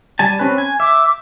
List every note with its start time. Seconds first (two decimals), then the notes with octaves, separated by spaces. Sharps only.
0.19 G3 G#5 A5
0.39 C4 C#4 B4
0.58 G#5
0.80 E5 D6